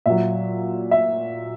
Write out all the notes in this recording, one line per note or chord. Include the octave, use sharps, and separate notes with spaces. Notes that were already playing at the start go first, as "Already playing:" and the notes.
A#2 F#3 E5
E5